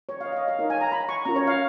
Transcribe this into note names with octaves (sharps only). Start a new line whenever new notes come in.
C#5
F5
D#5
F5
D#5
F5
D#4 A#4 C#5
G#5
A#5
B5
C#6
C#4 F4 A#4 A#5
C#5
F5